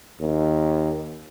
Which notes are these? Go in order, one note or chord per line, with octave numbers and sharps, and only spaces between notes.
D#2